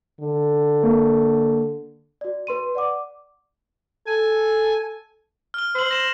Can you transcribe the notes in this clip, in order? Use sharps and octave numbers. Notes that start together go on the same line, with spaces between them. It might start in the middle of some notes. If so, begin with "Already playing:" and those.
D3
A#3
F#4 D5
B4 C6 D#7
D5 F#5 D6
A4 G#5
F6 G7
C5 E6 F#7
A#6 E7 F#7